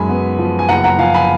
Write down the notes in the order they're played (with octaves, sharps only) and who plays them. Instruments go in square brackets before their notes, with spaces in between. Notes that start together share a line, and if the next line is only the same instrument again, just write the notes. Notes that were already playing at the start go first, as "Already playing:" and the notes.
Already playing: [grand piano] F#2 G#3 G#5 B5
B3
F3
G#5
F#1 F#5 A#5
F#5 A#5
F3 F5 G#5
G#5 B5